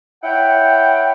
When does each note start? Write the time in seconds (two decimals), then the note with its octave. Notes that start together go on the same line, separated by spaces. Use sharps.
0.23 E4 C#5 F#5 G5